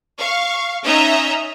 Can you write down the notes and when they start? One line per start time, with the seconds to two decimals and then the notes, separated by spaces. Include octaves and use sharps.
0.19 F5 C#6
0.85 C#4 D#4 D#5 E5 A#5